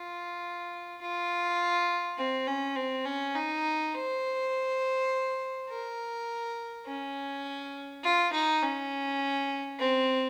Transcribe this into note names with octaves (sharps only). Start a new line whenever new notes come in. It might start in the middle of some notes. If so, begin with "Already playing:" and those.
Already playing: F4
F4
C4
C#4
C4
C#4
D#4
C5
A#4
C#4
F4
D#4
C#4
C4